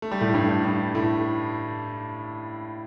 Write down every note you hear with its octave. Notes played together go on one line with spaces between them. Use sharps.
A3
G3
A2 A3
G2 G3
G2 G3
A2 A3